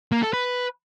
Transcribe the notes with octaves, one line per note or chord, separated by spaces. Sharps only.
A#3
A4
B4